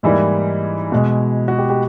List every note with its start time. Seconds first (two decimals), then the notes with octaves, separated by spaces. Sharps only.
0.03 G#2 E3 G3 A#3 E4
0.92 B2 G#3
1.48 F#4
1.59 G4
1.70 G4